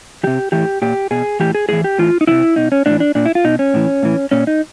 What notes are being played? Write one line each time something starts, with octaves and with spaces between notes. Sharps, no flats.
C3 E3 G4
A2 E3 G4
A#2 G4
B2 G#4
A2 E3 G4
G#4
A2 E3 G#4
G4
A2 E3 F4
D#4
C3 D#3 E4
B2 D#4
C#4
A2 E3 D4
D4
A#2 D4
E4
F4
B2 D#4
C#4
A2 E3
A2 E3
A#2 C#4
D#4